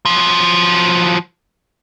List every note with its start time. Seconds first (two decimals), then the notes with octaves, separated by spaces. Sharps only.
0.05 F3 F#3